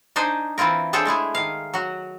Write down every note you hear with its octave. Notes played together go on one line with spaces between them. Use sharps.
D4 D#4 C5 G#5
E3 C4 E4 F4 A#4
D4 G#4 A4 C5 C#5 G5
G#3 A3 E4 G#4
D#3 F5
F#3 F#4